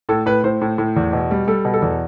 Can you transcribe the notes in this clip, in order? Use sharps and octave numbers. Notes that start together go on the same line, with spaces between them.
A2 A4
A2 B4
A2 C5
A2
A2
E2
B2
G3
G3 A4
B2
A4
E2